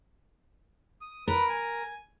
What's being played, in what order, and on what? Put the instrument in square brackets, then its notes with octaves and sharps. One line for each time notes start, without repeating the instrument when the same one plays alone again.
[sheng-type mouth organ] D#6
[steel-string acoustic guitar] A#4 [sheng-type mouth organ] B4 B5
[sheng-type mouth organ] G#5